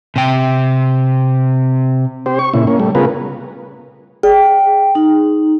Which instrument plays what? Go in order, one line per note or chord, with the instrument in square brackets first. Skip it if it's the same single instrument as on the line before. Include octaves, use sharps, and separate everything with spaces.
[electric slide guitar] C3 G5
[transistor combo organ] C4 G4 C5
C#6
A#2 C#3 E4
A#3 C#4
G3 A3
C#3 B3 F4 G#4 A#4 B4
[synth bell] G#4 [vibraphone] G5
[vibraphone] D#4